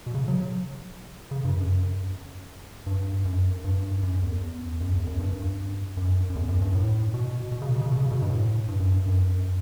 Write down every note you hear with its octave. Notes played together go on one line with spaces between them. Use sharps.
B2
C#3
F#3
C#3
G2
F#2
G2
F#2
G2
F#2
E2
F#2
E2
F#2
G2
F#2
F#2
E2
F#2
G2
A2
B2
B2
C#3
B2
C#3
B2
C#3
B2
G2
A2
G2
F#2
G2
F#2